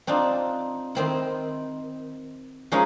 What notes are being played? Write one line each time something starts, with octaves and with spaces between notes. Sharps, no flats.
C4 D4 D#4 F4
D#3 C4 E4
F3 G#3 C#4 D#4 E4 A#4